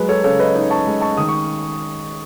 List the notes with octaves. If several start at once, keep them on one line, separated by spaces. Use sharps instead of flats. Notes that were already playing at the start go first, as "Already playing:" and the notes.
Already playing: F#3 G#3 B4
A4 C#5
C#3 A4 C#5
B4 D#5
D#4
A5 C#6
G#3
A5 C#6
D#3 D#6
C#6